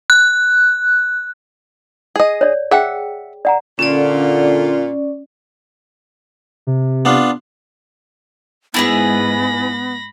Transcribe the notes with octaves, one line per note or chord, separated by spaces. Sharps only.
F#6
G#4 D#5
C#5 D5
G#4 E5 F#5 G5
D5 F#5 A#5
A#2 D3 C#4 F4 D5
C3
B3 D4 F4
G#2 B3 E4 G#4 B4 B5 A#6